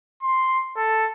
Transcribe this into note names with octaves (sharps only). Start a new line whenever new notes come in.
C6
A4